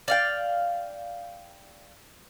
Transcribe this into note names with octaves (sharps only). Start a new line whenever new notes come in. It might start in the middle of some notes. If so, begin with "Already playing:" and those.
D5 F5 G5